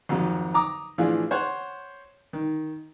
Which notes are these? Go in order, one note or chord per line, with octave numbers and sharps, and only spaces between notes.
G#1 F2 G#2 F#3
A#5 D6 D#6
A2 E3 F3 D4 F4 G#4
C5 C#5 F#5
D#3